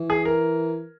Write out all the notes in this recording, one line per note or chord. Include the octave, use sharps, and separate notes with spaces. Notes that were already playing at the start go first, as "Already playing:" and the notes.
Already playing: E3
G#4
A#4